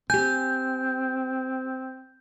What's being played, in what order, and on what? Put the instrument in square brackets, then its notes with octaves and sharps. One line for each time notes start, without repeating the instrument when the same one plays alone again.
[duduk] C4 [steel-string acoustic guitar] G4 G#5 [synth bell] G6